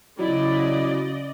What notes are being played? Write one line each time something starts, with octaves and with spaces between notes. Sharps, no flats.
C#3 F#3 E4 D5 D#5